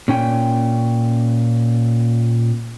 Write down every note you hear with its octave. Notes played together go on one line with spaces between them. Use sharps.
A#2 C#4 G5